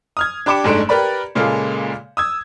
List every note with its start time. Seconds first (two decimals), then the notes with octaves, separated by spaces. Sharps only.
0.17 D#6 F6 G#6
0.46 D4 G4 B5 D6 C#7 E7
0.64 F#1 G#2 A3 D4 D7
0.89 G4 A#4 B4 D5 B5
1.35 A#2 C#3 G#3 A#3 F4 A4
2.17 D#6 E6 G#6